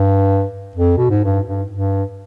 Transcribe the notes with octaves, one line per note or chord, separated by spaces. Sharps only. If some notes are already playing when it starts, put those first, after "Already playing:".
Already playing: G2
F2
B2
G#2
G2
G2
G2